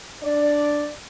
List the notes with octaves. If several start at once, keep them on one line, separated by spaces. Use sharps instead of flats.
D4 D5